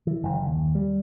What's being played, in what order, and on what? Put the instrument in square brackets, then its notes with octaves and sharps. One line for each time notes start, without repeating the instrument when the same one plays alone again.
[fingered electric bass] E3
F#1
D#2
G3